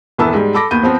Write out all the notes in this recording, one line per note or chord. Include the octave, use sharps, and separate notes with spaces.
D#1 E3 B3 A#4 A5 E6
G#2 G3
A4 B5 D6 A#6
D#2 B3 B5 G6 D#7
F3 B3 C4